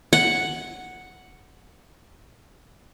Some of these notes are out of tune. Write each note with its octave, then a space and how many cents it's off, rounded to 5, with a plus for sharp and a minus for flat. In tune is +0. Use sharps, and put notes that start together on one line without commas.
F#5 +0